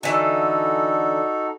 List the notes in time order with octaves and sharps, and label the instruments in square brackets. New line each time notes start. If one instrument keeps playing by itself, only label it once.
[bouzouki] D3 E3 [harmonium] D#4 F#4 A4